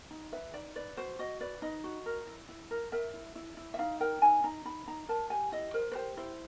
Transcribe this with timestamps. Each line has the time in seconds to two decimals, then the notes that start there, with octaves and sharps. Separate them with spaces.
0.11 D#4
0.32 B4 E5
0.54 D#4 D5
0.76 B4 D5
0.97 F#4 C5
1.19 F#4 D#5
1.40 B4 D5
1.62 D#4 D#5
1.84 F#4
2.06 A#4
2.27 E4
2.49 E4
2.71 A#4
2.92 A#4 E5
3.14 E4
3.35 E4
3.57 E4
3.74 E5
3.79 D#4 F5
4.00 A#4 G5
4.22 D#4 G#5
4.44 D#4 A#5
4.65 D#4 B5
4.88 D#4 A#5
5.09 A#4 A5
5.30 G4 G#5
5.52 E4 D#5
5.74 A#4 C5
5.92 B4
5.95 G4 C5
6.17 E4 C5